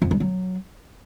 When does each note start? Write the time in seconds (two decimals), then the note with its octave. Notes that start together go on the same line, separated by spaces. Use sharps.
0.02 F2
0.11 G2
0.20 F#3